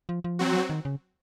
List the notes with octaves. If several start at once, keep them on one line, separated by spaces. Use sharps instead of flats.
F3
F3
F#3 C4 F#4
D#3
C#3